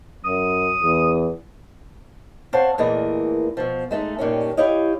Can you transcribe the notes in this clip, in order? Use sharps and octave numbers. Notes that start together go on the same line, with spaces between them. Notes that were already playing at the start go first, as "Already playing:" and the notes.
F#2 D#6
E2
C4 C5 C#5 F5 F#5 A5
E2 A#2 E3 A3 A#3 D#5
B2 F3
G#3 A3 D#4
G2 A#2 D#3 G3 C#4
E4 G4 C#5 D#5 F5